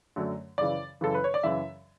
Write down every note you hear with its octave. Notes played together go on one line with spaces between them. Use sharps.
F#2 D3 F#3 A3
F#2 C#3 E3 D5
F#2 C#3 E3 A4
B4
C#5
D5
F#2 C#3 E3 E5